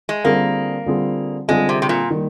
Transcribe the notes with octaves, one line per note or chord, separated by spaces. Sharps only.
G#3
D3 G3 A#3 C4 F4 G#4
D3 G3 C4 F4 G#4
D3 G3 G#3 C4 F4 G#4
C3
C3
A#2
D#3 G3 A#3